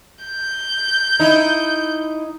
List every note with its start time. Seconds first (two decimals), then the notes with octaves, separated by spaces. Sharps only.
0.24 G6
1.20 D#4 E4